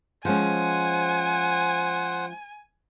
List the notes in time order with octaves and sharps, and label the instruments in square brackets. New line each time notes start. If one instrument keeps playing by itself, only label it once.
[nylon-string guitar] F3 G#3 C#4 [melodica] C5 F#5 [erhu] G#5